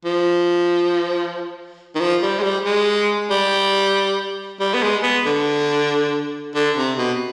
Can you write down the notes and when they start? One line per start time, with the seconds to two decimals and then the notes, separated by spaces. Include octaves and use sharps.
0.05 F3
1.95 D#3
2.00 F3
2.22 G3
2.39 G#3
2.43 G3
2.64 G#3
3.31 G3
4.60 G3
4.74 B3
4.82 G#3
5.03 B3
5.26 D3
6.55 D3
6.76 C3
6.98 B2